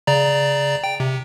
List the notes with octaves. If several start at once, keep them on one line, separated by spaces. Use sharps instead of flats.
C#3 D5 A#5
G5
C3